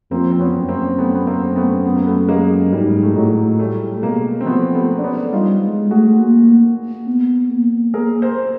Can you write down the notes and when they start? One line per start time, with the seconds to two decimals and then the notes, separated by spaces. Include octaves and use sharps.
0.11 F2 A#3 C4
0.31 C4
0.40 B3 C#4
0.55 F#2
0.69 A#3 C4
0.98 A3 B3
1.15 B3
1.27 A#3 C4
1.56 A3 B3
1.85 B3
1.96 A#3
2.06 A3 B3
2.28 G#3 A#3
2.73 G#2 G3
3.03 A3
3.15 A2 F#3 G#3
3.59 G3 A3
3.96 A3
4.02 B2 G#3 A#3
4.41 C4
4.46 F3 A3 B3
4.75 A3 B3
4.99 D4
5.03 B3 C#4
5.32 G3 D#4 F4
5.62 G#3
5.91 A3 F#4 G#4
6.19 A#3
7.07 B3
7.50 A#3
7.94 A#3 G#4 A#4
8.22 A#4 C5